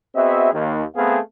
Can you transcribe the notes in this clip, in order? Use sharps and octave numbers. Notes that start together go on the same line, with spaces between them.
B3 C4 F#4 G#4 D#5 E5
D#2
A3 B3 C4 G#4 F5